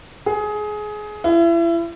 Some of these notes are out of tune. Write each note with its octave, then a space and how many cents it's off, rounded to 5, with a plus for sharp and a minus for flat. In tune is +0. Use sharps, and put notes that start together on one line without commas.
G#4 +20
E4 +35